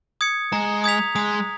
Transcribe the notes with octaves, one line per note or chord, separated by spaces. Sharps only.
D#6 G#6 C#7
G#3 A#5
D#6 G#6 B6 F7
G#3 D#6